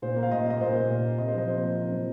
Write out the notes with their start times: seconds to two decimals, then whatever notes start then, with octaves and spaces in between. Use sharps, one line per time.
0.02 A#2 C5
0.16 A#3
0.23 F5
0.31 A#2 D#5
0.46 A#3 D#5
0.61 A#2 C5
0.75 A#3
0.90 A#2
1.04 A#3
1.18 C3 D#5
1.28 C5
1.34 F3 D#5
1.48 A#3 C5
1.63 C3
1.77 C3
1.92 F3